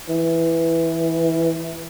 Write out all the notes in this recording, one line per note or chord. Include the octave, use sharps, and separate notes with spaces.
E3